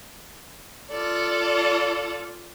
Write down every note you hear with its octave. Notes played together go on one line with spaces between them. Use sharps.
F4 A4 D5